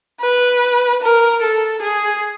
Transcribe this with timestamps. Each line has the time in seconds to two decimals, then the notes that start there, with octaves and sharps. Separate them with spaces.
0.21 B4
1.02 A#4
1.42 A4
1.82 G#4